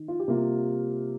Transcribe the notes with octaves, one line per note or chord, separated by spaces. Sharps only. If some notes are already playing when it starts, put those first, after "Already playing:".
Already playing: D#3
F4
G4
C3 G3 A#3 F4